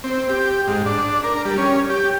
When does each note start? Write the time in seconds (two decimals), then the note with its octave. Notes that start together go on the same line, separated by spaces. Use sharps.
0.04 C4
0.29 G4
0.67 G#2
0.86 D4
1.24 A#4
1.45 G3
1.58 C#4
1.90 G4